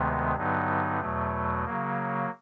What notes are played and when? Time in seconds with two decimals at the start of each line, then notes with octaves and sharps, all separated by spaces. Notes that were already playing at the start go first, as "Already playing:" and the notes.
Already playing: D2 C3 D#3 G#3 B3
0.36 G2 D3 F#3 B3 D#4
1.00 E2 B2 F#3 A3
1.65 C#3 F#3 A#3